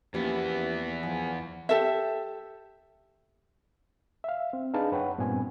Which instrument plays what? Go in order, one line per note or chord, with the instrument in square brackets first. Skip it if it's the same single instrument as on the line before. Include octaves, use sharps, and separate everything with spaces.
[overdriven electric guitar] E2 B3 [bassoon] E3 [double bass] F3 [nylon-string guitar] A#3 C#4 G4
[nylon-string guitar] E3 [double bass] F3 [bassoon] G#4
[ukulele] G4 A4 E5
[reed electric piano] E5 F5
C4
D4 D#4 G#4 B4 F5 A5
F#2 B4 C#5 F#5 G5
G2 A#2 B3 C4 G#5